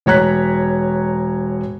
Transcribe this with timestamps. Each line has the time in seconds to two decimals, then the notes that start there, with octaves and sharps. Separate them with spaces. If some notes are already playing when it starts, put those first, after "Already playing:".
0.06 E1 C#5 A#5 F#6 B6